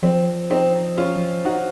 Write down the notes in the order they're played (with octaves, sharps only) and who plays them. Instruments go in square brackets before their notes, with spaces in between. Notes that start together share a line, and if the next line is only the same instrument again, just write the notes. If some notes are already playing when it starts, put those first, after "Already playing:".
[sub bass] F3 [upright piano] C4
[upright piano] C4 D#4
C#4 F4
D#4 F#4